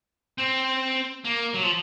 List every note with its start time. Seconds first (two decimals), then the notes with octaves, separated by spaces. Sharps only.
0.38 C4
1.25 A#3
1.54 F#3
1.64 F3